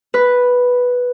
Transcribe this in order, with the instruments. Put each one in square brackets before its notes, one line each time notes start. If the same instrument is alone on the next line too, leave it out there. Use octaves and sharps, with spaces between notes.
[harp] B4